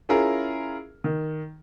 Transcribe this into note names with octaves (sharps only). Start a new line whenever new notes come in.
C#4 E4 F4 G#4 A#4
D#3